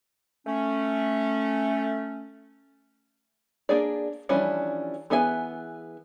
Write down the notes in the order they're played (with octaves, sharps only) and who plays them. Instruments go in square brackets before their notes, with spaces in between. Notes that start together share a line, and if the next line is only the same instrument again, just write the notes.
[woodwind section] A3 C#4
[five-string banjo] A#3 D4 G#4 D5
E3 F3 G3 C#4 D4
E3 B3 G#4 E5 G#5